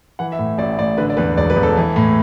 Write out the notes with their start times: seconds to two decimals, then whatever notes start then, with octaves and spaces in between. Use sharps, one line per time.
0.19 E3 F#5
0.32 E5
0.39 A2
0.58 A1 D5
0.78 A1 D5
0.98 D3 B4
1.10 D5
1.17 E2 B4
1.37 E1 D5
1.50 B4
1.56 E1
1.63 A4
1.77 E3
1.96 A2